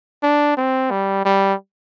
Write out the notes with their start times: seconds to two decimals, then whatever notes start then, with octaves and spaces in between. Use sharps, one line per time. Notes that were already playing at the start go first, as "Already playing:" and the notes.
0.23 D4
0.57 C4
0.91 G3
1.25 G3